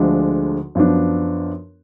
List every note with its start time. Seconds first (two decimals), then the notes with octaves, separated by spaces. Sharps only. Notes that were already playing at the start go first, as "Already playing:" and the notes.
Already playing: D2 D3 F3 G#3 D4
0.75 F#2 F3 B3 D4